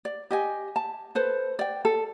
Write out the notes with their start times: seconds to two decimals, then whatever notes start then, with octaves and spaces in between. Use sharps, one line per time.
0.05 D5
0.31 G4 D#5 G#5
0.76 A5
1.15 A4 B4 C5
1.59 D5 G5
1.85 A4